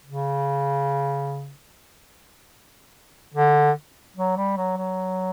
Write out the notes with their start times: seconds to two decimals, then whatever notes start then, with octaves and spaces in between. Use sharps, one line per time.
0.06 C#3
3.34 D3
4.16 F#3
4.37 G3
4.57 F#3
4.77 F#3